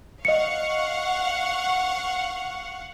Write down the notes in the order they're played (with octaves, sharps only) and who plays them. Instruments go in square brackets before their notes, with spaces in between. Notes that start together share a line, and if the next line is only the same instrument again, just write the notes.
[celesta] D#5 C#7 [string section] F5 F#5 C#6